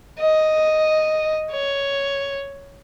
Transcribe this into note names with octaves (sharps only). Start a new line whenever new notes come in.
D#5
C#5